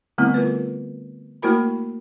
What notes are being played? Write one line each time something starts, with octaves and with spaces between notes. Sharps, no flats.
D3 G3 A3 B3 C4 E4
F4 A#4 B4
A3 A#3 E4 F#4 A#4 B5